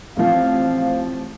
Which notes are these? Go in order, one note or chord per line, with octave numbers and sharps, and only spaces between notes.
A1 F3 C4 F5